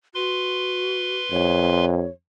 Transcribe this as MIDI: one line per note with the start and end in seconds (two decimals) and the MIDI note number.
0.15 1.19 66
0.15 1.85 71
0.15 1.85 84
1.32 2.07 41
1.32 2.09 73